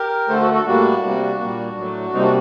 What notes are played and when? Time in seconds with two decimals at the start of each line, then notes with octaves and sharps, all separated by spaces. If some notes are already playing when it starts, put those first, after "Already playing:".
Already playing: G4 A#4
0.29 D3 A3 A4 C5
0.41 F#4 A4
0.53 F#4 A4
0.66 A2 G3 A#3 D4 F#4
1.03 C3 G3 A#3
1.39 A#2 G3 A#3
1.76 A2 F#3 A3
2.13 C3 G3 A#3 C4 D#4
2.23 D4 F#4